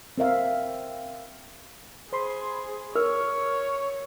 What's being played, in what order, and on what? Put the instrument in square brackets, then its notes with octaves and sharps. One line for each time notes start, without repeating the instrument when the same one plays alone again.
[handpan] C4 A#4 E5 F5
[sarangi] G#4 [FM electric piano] C5 B5 C6
[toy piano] A#4 [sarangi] C#5 [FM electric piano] F6